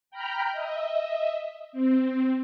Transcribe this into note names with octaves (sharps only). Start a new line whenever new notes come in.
G5 A#5 B5 F6 G6
D#5 E5
C4